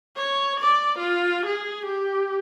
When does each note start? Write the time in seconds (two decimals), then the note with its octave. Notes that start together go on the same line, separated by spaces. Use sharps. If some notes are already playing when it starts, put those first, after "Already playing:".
0.16 C#5
0.60 D5
0.99 F4
1.46 G#4
1.86 G4